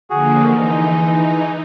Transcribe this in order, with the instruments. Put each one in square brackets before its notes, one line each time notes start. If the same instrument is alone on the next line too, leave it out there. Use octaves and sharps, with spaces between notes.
[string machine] D3 F3 A#3 [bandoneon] F#4 G#4
[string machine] E3 D#4 [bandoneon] G#3